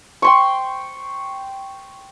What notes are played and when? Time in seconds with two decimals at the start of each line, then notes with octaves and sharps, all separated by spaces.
0.22 G5 C6 C#6